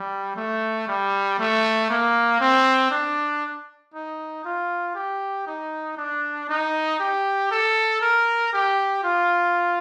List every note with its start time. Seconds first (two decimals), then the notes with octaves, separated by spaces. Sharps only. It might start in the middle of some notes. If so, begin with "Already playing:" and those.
Already playing: G3
0.36 A3
0.88 G3
1.39 A3
1.90 A#3
2.40 C4
2.91 D4
3.94 D#4
4.44 F4
4.95 G4
5.47 D#4
5.97 D4
6.49 D#4
6.99 G4
7.51 A4
8.01 A#4
8.53 G4
9.03 F4